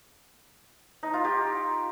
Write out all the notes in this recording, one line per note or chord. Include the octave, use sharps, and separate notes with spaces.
D#4
F4
G4